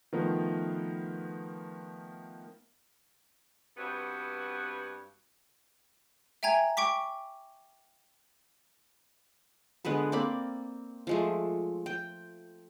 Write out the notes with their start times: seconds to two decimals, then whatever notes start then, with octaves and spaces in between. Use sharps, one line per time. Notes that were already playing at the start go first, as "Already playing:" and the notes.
0.13 D#3 F3 A3 B3 A#4
3.77 G2 B3 C4 F#4
6.43 E5 G5 G#5 A#5 G#6
6.77 G5 C#6 D6 B6
9.85 D3 G#3 B3 B4
10.12 A#3 C4 D5 B5
11.07 F3 G#3 A3
11.86 G5